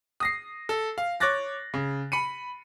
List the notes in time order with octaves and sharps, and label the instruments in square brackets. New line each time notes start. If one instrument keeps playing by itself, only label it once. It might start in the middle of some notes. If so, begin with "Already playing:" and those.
[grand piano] D#6 A#6 C7
A4
F5
C#5 D6 F#6 A6 A#6
C#3
B5 C#7 D#7